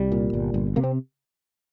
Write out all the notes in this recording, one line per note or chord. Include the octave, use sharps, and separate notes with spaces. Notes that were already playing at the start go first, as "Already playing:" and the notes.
Already playing: C2 G3
A#2
G1
G1
C3 A#3
C4